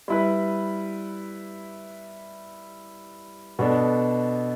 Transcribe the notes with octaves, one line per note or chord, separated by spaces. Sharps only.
G3 E4 B4
B2 B3 D4 A4